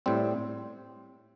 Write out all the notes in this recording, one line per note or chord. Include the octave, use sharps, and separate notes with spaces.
A2 G3 C4